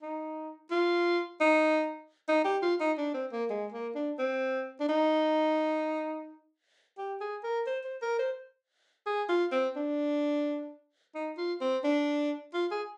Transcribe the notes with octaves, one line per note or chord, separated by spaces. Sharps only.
D#4
F4
D#4
D#4
G4
F4
D#4
D4
C4
A#3
G#3
A#3
D4
C4
D4
D#4
G4
G#4
A#4
C5
C5
A#4
C5
G#4
F4
C4
D4
D#4
F4
C4
D4
F4
G#4